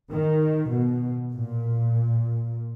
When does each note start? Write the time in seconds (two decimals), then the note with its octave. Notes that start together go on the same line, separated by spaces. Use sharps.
0.11 D#3
0.71 B2
1.34 A#2